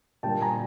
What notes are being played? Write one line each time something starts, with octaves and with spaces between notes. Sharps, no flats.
A#2 G3 A#3 D4 G5 A5
G#5 A#5